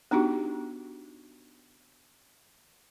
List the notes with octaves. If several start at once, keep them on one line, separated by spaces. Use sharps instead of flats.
B3 D4 D#4 F#4 G4